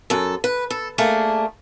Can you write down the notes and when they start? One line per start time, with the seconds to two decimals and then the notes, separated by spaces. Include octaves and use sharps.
0.10 F#2 A4
0.44 B4
0.70 A4
0.98 A3 A#3 D4 G#4